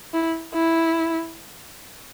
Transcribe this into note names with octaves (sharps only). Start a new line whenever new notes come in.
E4
E4